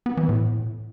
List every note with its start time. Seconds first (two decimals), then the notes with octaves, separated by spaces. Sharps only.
0.06 B3
0.17 E3
0.29 A2